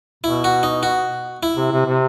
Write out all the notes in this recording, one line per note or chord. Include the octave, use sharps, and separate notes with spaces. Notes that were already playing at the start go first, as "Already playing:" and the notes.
B2 E4
F#4
D#4
F#4
E4
C3
C3
C3